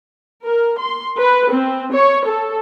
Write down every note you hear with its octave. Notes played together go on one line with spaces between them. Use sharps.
A#4
C6
B4
C4
C#5
A4